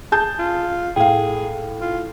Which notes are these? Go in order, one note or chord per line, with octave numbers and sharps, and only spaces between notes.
G#4 A5 G6
F4
A2 G#4 F5 G5
F4